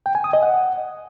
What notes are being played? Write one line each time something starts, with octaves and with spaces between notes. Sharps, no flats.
G5
G#5
D#6
D#5
F#5